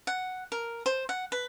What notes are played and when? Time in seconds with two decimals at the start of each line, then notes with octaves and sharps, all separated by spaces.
0.07 F#5
0.52 A#4
0.86 C5
1.09 F#5
1.32 B4